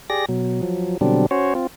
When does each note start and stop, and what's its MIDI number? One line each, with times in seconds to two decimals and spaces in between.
0.10 0.26 67
0.10 0.26 68
0.10 0.26 74
0.10 0.26 94
0.29 0.61 47
0.29 0.61 54
0.63 0.97 53
0.63 0.97 54
1.01 1.26 47
1.01 1.26 50
1.01 1.26 54
1.01 1.26 55
1.01 1.26 60
1.01 1.26 62
1.31 1.54 61
1.31 1.54 66
1.31 1.54 72
1.31 1.54 73
1.55 1.67 60
1.55 1.67 65